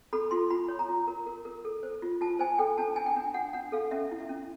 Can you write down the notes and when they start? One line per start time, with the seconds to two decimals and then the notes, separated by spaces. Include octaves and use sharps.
0.13 A4 B5
0.31 F4 C6
0.50 F4 B5
0.68 C#5
0.79 A#5
0.89 F4
1.07 A#4
1.26 A#4
1.45 A#4
1.65 A4
1.83 C5
2.02 F4
2.21 F4 A5
2.39 C5 G#5
2.58 A4 G5
2.78 D4 A5
2.96 D4 G#5
3.06 G5
3.16 D4
3.34 D4 F#5
3.53 D4 F#5
3.72 A4 F5
3.91 C#4 E5
4.11 E4
4.20 E5
4.29 C#4